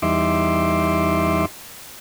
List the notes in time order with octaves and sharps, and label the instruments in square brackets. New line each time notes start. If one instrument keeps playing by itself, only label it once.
[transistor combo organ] E2 G3 D#4 E5 C6 D6